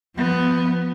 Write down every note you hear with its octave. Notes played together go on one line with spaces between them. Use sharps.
F3 B3